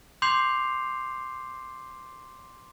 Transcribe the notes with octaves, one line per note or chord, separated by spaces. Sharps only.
C6 D6 G6 C7 F7